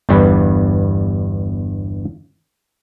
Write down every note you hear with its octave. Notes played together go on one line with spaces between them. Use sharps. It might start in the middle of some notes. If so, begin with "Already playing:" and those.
G1 E2 G2 G3 B4